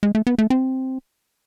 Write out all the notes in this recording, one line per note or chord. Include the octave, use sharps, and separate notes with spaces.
G#3
A3
B3
A3
C4